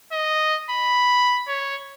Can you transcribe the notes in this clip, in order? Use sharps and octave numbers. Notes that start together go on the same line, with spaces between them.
D#5
B5
C#5